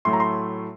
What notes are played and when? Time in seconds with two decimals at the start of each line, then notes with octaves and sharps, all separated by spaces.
0.05 A2 F#3 A3 C6
0.13 A#5
0.20 C6